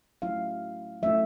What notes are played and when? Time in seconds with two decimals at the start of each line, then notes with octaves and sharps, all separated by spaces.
0.22 F#3 A3 C#4 E4 F5
1.02 F#3 A3 C#4 E4 E5